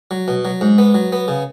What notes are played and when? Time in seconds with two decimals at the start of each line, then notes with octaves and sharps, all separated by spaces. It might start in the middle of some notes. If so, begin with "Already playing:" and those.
0.11 F#3
0.28 B2
0.45 F#3
0.61 G#2
0.78 B3
0.94 F#3
1.12 B3
1.28 C#3